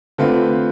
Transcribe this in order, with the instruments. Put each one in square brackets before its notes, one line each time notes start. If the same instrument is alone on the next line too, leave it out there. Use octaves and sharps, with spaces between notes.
[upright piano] D3 A3 C4 F4 B4